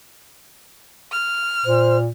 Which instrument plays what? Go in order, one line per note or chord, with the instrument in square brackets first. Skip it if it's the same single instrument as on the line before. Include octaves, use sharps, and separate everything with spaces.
[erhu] F6
[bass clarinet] A#2 [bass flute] C5